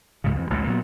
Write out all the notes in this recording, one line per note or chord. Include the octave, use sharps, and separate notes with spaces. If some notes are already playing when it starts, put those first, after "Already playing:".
C#2 G#2 C#3
F2 E3
A1 D2 D3 G#3
A#2 F#3 B3